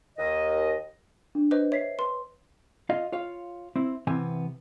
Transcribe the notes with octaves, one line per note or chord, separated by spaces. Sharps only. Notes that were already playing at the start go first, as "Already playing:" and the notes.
D#2 D#5
D4
B4 C5 D#5
C#5 E5 B6 C7
B4 C6
F4 D#5 F5
F4 C#5 F5
C4 E4
C3 E3 B3 C4 G#5